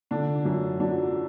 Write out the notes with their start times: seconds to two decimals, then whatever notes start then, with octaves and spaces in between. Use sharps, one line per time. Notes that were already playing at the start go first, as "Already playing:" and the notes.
0.11 D3 D4
0.45 F#2
0.80 F#3 D4